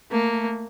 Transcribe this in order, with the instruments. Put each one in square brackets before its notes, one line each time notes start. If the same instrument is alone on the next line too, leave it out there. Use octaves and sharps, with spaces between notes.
[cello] A3 [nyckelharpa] A#3